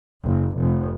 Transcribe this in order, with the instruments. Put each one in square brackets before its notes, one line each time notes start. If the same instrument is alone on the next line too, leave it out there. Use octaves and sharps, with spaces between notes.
[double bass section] F#1
F1